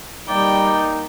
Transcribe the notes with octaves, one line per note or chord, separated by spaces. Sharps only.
G3 A#3 D#4 D5 G5 A#5